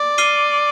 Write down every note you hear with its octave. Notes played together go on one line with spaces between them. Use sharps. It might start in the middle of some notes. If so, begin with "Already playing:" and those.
Already playing: D5
D6 F6 C7 D#7 G7